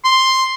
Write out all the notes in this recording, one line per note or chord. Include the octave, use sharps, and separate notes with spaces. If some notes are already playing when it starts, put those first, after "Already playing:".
C6